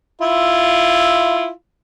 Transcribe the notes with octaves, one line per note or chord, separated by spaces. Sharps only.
E4 F4